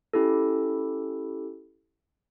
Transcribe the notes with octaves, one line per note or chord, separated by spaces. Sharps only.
C#4 E4 G4 A4